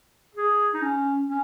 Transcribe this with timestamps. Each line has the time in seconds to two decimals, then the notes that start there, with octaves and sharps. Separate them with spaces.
0.35 G#4
0.74 D#4
0.82 C#4
1.28 C#4